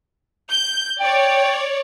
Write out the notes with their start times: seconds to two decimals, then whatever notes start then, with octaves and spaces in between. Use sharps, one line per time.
0.51 G6
1.00 C#5 D5 G5